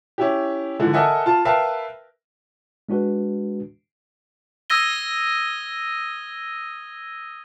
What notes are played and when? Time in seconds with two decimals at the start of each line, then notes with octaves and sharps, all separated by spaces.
0.18 C#4 E4 G4
0.79 G#2 D3 E3 F3
0.93 A4 A#4 D#5 E5 F#5 G#5
1.26 F4 A5
1.45 A#4 B4 E5 F5 G5 A5
2.89 G#3 D4 F#4 B4
4.70 D#6 E6 G#6 A#6 D#7 G7